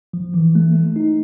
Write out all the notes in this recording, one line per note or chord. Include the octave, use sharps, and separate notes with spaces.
F3
E3
A3
A3
D#4